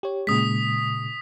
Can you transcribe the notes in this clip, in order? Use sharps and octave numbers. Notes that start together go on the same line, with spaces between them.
G4 C#5
A#2 C#3 G#3 D#6 B6